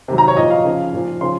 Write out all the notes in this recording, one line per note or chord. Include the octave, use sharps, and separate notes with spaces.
C3 D#3 F#3
A#5
C#5
A#2 F3 D#5
F5
C#3 F3
A#2 F3
C#3 F3 C6